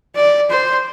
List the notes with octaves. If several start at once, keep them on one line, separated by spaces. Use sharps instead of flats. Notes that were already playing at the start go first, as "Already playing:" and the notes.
D5
C5